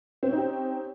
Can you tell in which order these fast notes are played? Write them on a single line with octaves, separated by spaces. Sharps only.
C4 C#4 D#4 G4